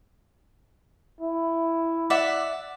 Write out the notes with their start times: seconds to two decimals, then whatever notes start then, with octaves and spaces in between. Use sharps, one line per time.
1.21 E4
2.10 D5 E5 F#5